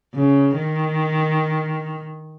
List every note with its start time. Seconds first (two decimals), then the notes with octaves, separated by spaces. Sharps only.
0.15 C#3
0.55 D#3